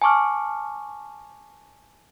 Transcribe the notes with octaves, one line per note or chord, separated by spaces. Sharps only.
G#5 A5 C#6 D6 F6